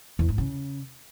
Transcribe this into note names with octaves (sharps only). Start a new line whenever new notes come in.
E2
G#2
C#3